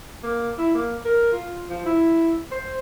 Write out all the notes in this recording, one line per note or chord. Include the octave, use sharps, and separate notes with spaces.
A#3
E4
A#3
A#4
F4
F3
E4
C5